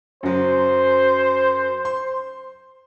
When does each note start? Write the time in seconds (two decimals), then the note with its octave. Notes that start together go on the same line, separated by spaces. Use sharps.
0.23 F#2 C#3 F#3 C5
1.85 C6